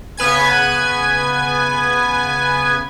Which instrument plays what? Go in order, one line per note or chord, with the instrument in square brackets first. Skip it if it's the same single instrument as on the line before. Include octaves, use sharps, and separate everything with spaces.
[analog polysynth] C#3 B3 B4 G#5 G#6